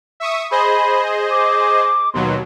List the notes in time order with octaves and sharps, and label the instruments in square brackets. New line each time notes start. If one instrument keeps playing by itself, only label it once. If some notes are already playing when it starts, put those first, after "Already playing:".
[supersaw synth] E5 C#6 D#6
[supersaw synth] G#4 C5 D#5 [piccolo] B5
[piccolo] D6
[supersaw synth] D#2 B2 F#3 [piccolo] C6